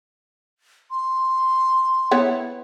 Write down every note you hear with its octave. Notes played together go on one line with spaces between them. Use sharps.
C6
B3 E4 C#5